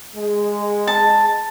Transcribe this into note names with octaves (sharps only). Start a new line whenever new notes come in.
G#3
A5